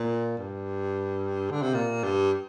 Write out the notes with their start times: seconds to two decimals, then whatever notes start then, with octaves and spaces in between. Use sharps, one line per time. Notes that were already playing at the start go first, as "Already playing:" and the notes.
Already playing: A#2
0.38 G2
1.51 D3
1.62 C3
1.74 A#2
2.04 G2